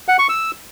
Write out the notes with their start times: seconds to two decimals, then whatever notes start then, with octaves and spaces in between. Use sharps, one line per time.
0.08 F#5
0.19 C#6
0.29 E6